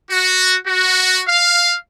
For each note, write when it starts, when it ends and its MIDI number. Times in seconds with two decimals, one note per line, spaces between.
0.11 0.57 66
0.67 1.22 66
1.28 1.76 77